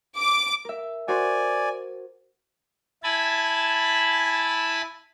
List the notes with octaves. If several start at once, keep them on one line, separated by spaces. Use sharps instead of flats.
D6
A#4 E5
F#4 A#4 C5 D5 G#5
E4 G#5 A5 B5